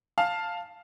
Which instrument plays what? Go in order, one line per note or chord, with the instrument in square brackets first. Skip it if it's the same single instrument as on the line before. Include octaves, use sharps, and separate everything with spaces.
[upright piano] F5 A5